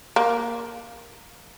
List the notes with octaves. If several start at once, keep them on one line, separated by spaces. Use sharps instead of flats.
A#3